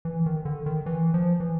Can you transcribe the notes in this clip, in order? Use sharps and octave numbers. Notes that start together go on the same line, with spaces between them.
E3
D#3
D3
D#3
E3
F3
E3